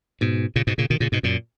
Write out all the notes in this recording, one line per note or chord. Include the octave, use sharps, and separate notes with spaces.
G#2 B2
A#2 C#3
G#2 B2
A#2 C#3
B2 D#3
A#2 C#3
G#2 B2
F#2 A#2